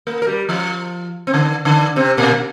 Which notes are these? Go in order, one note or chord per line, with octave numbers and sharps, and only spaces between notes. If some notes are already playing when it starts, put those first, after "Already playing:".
A#3 A#4
A#4
G3 G4
F3 F4
C4
D3 D4
D3 D4
C3 C4
A#2 A#3